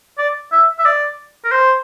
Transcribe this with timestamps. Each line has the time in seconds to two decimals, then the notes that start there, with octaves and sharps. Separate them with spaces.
0.18 D5
0.52 E5
0.79 E5
0.86 D5
1.45 A#4
1.52 C5